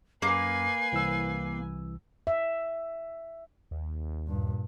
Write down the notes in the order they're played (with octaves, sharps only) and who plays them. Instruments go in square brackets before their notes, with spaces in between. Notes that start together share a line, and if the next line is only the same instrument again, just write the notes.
[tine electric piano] F#2 [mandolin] A#3 [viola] B4 G#5 [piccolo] C7
[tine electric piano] C2 E3 E6
[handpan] E5
[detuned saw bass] D#2
[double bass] G2 A#2